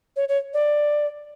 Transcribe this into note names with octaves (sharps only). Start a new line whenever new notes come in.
C#5
C#5
D5